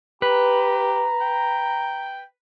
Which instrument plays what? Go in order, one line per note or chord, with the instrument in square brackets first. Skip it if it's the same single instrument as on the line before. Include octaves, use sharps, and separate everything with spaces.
[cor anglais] G4 [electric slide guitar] B4 [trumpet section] A#5
[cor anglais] G5